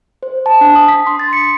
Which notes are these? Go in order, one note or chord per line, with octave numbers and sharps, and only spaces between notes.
C5
A5
D4
D#6
B6
C6
A6
C#7